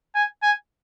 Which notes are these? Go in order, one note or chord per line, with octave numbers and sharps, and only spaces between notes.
G#5
G#5